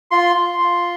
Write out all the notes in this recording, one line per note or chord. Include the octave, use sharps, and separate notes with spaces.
F4 C6
F4
F4